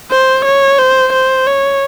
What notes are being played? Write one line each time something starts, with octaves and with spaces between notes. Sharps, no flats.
C5
C#5
C5
C5
C#5